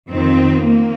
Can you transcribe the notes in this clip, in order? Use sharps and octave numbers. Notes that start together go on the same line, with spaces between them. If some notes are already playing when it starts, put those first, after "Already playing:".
F2 D#3 C4
A#3